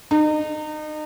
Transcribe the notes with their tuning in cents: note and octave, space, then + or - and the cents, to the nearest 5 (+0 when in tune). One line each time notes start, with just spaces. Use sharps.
D#4 -30